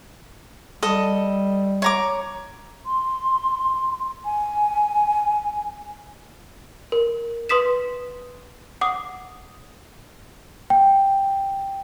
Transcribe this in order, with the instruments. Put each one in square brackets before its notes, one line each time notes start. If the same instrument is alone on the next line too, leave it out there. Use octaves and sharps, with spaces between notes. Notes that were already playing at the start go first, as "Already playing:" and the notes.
[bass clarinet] G3 [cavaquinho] A4 D#5
[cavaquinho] C#5 A#5 D6
[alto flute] C6
G#5
[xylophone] A#4
B4 C6 D#6 B6 E7
F#5 D6 D#6
[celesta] G5